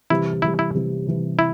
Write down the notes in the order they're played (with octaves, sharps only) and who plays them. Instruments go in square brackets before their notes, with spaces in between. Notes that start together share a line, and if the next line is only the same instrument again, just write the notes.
[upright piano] C3 E3 G3 [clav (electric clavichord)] E4
[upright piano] C3 E3 G3 [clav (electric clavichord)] E4
[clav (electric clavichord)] E4
[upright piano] C3 E3 G3
C3 E3 G3
[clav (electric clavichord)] E4